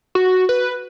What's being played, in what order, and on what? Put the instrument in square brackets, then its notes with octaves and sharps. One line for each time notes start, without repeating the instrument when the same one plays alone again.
[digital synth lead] F#4
B4